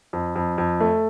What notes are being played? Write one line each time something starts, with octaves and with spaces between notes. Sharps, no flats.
F2
F2
F2
A3